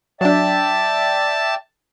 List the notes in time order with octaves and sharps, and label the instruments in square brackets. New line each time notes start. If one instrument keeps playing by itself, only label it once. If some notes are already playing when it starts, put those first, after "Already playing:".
[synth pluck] F#3 D4 [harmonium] D5 E5 G5 [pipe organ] A5